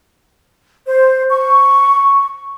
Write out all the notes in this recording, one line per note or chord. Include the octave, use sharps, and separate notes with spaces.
C5
C#6